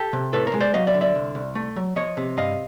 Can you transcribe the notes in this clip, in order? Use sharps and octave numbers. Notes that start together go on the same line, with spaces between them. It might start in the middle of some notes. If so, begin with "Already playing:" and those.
Already playing: G4 A4
C3
A2 A4 B4
A#4 C5
G#3
C5 D5
F#3 D#5 F5
D5 E5
D3
D5 E5
C2
C2
A3
F#3
F3 C#5 D#5
C3
G2 D#5 F5